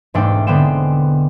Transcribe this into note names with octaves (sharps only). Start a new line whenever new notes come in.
E1 G#2 A3 D4 G5
D3 G#3 B3 C4 G5 E7